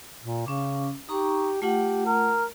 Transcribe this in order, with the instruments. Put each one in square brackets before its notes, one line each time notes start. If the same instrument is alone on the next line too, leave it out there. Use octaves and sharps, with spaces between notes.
[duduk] A#2
[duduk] C#3 [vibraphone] C#4 D6
[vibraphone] D#4 A#5 C#6 [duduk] G4
[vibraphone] A3 F4 F#5 [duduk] G4
[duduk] A#4